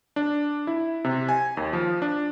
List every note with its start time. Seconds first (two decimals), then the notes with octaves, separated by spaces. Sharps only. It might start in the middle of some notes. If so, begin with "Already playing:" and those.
0.16 D4
0.67 E4
1.04 C3
1.29 G#5
1.57 D#2
1.73 F3
2.02 D4